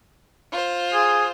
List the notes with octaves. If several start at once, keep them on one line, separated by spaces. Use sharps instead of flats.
F4 C5
G#4